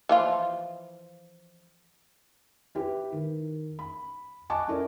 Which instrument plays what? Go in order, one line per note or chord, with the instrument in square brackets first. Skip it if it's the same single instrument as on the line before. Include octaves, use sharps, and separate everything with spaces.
[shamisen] E3 F3 F4
[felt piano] E4 G4 B4
D#3
B5
D#5 F#5 G#5 A5 C#6 D6
C#4 E4 A4 A#4 D5